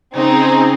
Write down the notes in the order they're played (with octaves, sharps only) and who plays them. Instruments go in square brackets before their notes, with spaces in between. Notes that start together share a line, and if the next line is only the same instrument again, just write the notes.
[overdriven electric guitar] C#3 [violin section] C4 D#4 G#4